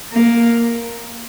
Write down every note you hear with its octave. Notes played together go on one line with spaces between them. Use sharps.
A#3